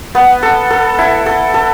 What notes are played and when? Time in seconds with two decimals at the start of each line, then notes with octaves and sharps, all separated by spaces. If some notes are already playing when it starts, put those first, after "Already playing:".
0.15 B3
0.43 A4
0.70 A4
0.99 E4
1.26 A4
1.54 A4